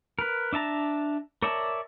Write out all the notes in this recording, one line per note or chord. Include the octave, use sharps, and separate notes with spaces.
A#4 B4
D4 E5 A5 A#5
A#4 C#5 D5 E5 A5